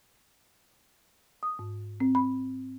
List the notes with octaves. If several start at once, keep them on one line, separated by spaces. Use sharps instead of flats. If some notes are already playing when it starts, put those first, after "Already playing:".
D#6
G#2
C4
B5